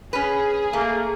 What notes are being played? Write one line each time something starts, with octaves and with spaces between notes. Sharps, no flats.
C#4 G#4 B4
A3 A#3